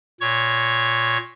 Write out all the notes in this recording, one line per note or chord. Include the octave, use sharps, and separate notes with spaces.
A#2 C#5 C#6